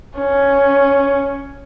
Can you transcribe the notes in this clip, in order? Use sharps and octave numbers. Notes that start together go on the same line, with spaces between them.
C#4